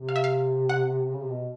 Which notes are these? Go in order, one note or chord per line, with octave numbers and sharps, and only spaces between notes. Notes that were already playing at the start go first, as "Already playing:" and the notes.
Already playing: C3
F5
E5
F5
F#5
C#3
C3
B2